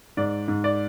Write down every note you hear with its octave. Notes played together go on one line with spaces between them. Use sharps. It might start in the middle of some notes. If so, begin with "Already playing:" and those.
G#2 D5
G#2
D5